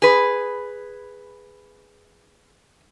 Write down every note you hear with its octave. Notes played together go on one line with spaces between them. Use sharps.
G#4 B4